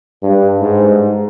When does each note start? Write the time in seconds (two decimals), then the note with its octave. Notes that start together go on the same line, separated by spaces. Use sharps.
0.23 G2
0.61 G#2